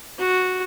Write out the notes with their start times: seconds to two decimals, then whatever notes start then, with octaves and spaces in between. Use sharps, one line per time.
0.19 F#4